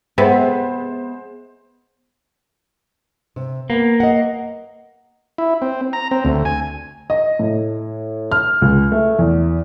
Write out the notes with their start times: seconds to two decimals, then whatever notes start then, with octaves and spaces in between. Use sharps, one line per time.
0.18 C3 G#3 B3 C5
3.36 C3
3.70 A#3 B3
4.00 D#5 F#5
5.38 E4
5.62 C4
5.93 A#5
6.11 C4
6.25 D2
6.45 G#5
7.10 D#5
7.39 A2
8.32 F6
8.62 C#2
8.92 A3
9.19 E2